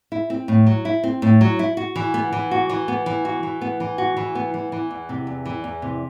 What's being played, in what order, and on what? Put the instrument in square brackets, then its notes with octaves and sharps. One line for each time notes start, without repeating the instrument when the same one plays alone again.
[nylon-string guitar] E4
C4
A2
F#3
E4
C4
A2
F#3
E4
F#4
E3
B3
E3
F#4
E3
B3
E3
F#4
E3
B3
E3
F#4
E3
B3
E3
E3
E2
C3
E2
E3
E2
C3